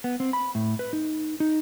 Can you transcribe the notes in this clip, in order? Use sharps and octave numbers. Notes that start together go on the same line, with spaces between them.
B3
C4
B5
A2
B4
D#4
D#4